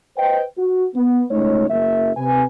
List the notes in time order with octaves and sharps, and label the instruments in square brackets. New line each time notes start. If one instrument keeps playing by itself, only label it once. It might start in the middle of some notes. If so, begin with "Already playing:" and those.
[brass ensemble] B4 C5 D#5 G5
F#4
B3
C#2 A3 D#4 C#5
F#1 A#3 E5
C3 B4 G#5